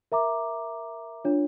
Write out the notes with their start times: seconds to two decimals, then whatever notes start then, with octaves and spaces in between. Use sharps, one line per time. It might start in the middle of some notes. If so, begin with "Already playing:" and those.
0.12 A#4 E5 A#5 D6
1.25 D4 F4 C#5